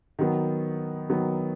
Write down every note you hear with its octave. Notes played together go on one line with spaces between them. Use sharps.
D#3 F#3 B3
D#3 F#3 B3